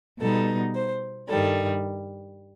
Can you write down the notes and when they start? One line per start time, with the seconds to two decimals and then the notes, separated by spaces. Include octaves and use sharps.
0.20 B2 G3 B3 D#4 A4
0.75 C5
1.29 G2 D#3 G3 A4